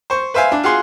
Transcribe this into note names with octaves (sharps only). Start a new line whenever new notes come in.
C5 C#6
B4 C5 E5 F5 G#5
D4
F4 F#4 G#4 C6